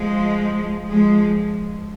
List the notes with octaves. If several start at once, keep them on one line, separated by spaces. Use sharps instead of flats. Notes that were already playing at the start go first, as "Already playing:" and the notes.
Already playing: F3 G#3
F3 G#3